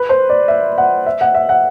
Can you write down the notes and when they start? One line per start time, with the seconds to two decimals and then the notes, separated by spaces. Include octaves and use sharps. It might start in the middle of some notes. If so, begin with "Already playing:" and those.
Already playing: B4
0.09 C5
0.29 D5
0.48 E5
0.78 F#5
1.06 E5
1.21 F#5
1.35 E5
1.49 F#5